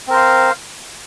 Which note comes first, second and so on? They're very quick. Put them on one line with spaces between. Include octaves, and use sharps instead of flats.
C4 A#4 C5 F5